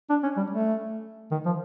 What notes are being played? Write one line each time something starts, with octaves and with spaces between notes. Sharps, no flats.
D4
C#4
G3
A3
D#3
F3